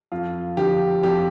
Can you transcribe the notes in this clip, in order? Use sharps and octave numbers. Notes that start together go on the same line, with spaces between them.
F2 F4
D3 F3 G4
F2 G4